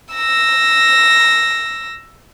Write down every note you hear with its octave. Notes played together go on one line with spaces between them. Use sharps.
E6 A#6